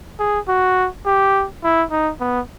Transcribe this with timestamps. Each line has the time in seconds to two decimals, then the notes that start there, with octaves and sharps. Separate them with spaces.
0.20 G#4
0.48 F#4
1.06 G4
1.64 E4
1.91 D#4
2.20 B3